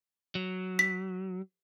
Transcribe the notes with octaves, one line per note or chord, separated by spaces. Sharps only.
F#3
B6